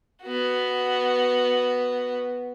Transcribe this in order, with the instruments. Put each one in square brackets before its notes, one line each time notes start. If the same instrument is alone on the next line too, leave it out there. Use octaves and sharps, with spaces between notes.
[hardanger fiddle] B3 F#4